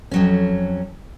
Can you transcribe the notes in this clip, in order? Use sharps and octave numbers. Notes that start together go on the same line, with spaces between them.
F2 F#3 C#4